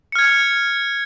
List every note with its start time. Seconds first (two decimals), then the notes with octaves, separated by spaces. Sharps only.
0.12 C#7
0.15 F6
0.19 G#6